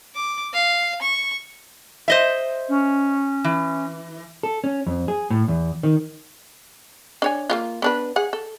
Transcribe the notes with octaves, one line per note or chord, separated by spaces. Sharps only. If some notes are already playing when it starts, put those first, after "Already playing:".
D6
F5
C#6
C5 D#5 E5
C#4
E3
A4
C#4
F2
G#4
A2
E2
D#3
D4 C#5 G#5
A#3 C#4 F4
B3 D4 B4
G#4 F#5
A4